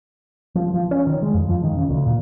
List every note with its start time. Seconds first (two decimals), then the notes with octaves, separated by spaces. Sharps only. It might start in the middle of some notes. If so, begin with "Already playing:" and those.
0.55 F3
0.74 F3
0.91 C#4
1.07 D#3
1.22 G#3
1.34 F2
1.49 F3
1.63 D#3
1.77 C#3
1.89 D2
2.06 A#2